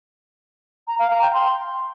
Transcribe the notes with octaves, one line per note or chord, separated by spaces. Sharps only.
A#5
F5
A#5
G5
C6